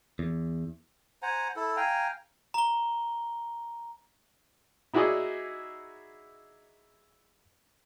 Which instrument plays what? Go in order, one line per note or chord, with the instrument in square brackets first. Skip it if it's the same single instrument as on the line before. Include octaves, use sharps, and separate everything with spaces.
[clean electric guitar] E2
[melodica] C5 F#5 G#5 A#5
E4 A4
F5 G5 G#5 A#5
[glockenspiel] A#5 G7
[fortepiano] D#4 E4 F#4 G#4 D5 D#5